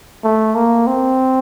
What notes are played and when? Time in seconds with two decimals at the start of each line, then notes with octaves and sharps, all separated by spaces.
0.24 A3
0.55 A#3
0.87 C4